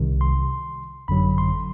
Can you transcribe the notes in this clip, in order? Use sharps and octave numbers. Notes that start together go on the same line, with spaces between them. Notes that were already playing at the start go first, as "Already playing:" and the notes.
Already playing: C2 C3 D#3
C6
G#1 F#2 D3 F#3 B5
C6